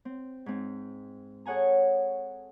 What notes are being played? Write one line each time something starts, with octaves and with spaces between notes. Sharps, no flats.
C4
G#2 C4
G#4 A4 C#5 F#5 G#5 A#5